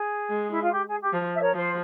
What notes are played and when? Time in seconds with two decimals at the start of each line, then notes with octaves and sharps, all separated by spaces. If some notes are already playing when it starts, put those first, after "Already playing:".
Already playing: G#4
0.30 G#3
0.48 E4
0.60 F4
0.71 G4
0.85 G#4
0.99 G4
1.12 F3
1.34 E5
1.40 A#4 C#5
1.53 F3 C5